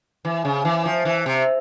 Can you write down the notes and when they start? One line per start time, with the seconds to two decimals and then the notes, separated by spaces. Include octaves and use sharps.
0.25 E3
0.45 C#3
0.65 E3
0.85 F3
1.05 E3
1.26 C3